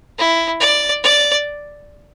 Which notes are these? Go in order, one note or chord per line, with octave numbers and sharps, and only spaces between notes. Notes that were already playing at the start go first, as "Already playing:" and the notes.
E4
D5
D5